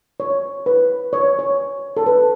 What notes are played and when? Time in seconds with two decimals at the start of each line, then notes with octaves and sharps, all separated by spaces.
0.20 C#5
0.66 B4
1.13 C#5
1.39 C#5
1.97 A4
2.06 B4